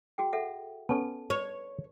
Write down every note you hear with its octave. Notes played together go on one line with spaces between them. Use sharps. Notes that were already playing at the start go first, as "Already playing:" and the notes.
F#4 G#4 G5
A4 E5 F#5
B3 C#4 A4 A5
B4 C#5